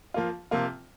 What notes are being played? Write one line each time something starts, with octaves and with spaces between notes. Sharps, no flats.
F3 A#3 F4
C3 F3 A#3 F4